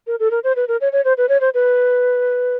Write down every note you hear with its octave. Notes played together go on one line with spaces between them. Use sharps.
A#4
A4
A#4
C5
B4
A#4
C#5
C#5
C5
B4
C#5
C5
B4